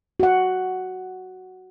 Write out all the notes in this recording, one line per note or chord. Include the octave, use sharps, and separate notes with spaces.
F#4 F#5